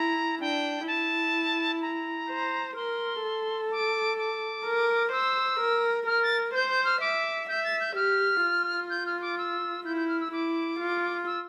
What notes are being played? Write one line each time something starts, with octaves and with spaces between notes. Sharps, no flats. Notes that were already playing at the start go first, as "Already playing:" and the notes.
Already playing: E4 A#5
D4 G5
E4 A5
A#5
C5
A#4 C6
A4
D6
D6
A#4
C5 E6
A#4
A#4 F6
A6
C5 G6
G6
F6
E5 D6
E5 G6
A6
G6
G4 F6
F4
G6
F6
D6
E6
E4 G6
G6
F6
E6
E4 D6
F4
E6